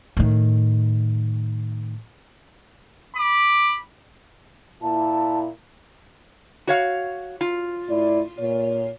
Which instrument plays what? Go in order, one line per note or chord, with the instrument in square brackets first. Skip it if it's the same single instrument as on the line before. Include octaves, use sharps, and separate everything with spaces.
[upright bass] A2 D#3
[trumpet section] B5 D6
[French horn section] A#2 E4 [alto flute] A5
[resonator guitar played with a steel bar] F#4 C#5 F5
F4
[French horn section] A2 E4 D5
A#2 C#5